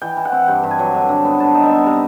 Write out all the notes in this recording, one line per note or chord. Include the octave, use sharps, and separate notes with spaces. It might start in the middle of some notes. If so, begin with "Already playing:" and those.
E3 G5
E3
F#5
C4
G2 G5
G2
G#5
F#3
D3 E5
D3
B3
D3 A5
D#4
E5
B3
C3 A#5